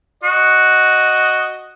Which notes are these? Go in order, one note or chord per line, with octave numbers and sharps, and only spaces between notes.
F#4 D#5